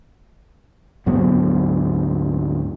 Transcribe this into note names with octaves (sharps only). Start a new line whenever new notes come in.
D2 G#2 F#3 B3